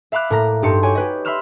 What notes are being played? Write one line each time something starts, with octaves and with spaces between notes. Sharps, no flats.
E5 F5 B5 D6 F#6
A2 A#3 A#5 A#6
G2 D#4 G4 A4 C6 C#7
F#4 G4 C#5 G#5
G4 B4 D#5
E5 B5 C6 E6 F6 E7